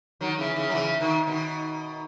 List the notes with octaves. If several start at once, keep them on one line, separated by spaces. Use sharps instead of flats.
D#3 F#3
C#3 E3
C#3 E3
F#3
C#3 E3
B2 D#3
B2 D#3